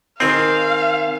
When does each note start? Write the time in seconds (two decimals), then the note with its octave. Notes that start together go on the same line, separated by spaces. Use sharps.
0.20 D#3 C4 G#4 F5